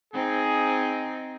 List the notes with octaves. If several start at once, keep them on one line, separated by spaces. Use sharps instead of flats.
C4 D#4 G#4